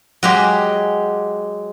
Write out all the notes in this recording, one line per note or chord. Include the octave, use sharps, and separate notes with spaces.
F#3 G#3 G4